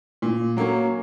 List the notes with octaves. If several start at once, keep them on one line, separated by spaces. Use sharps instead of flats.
A#2
F#3 A#3 C#4